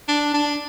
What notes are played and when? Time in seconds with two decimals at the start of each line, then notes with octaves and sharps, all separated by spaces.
0.08 D4
0.34 D4